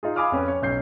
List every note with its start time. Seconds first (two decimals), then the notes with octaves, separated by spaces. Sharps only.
0.03 D#4 F4 G#4
0.16 F5 G#5 B5 D6 D#6 F6
0.32 F2 C#4 B4
0.48 C#5
0.62 B1 C#4 G6 C7